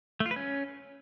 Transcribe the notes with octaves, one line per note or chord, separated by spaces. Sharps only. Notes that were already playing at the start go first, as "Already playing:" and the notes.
A3
F4
B4
C#4